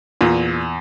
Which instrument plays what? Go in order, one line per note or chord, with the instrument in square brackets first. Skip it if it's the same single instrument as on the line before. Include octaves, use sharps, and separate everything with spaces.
[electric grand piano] E2 [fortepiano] A#2